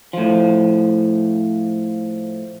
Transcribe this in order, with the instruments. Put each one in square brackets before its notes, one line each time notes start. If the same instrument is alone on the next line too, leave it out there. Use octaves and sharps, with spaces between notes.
[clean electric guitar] A2 F3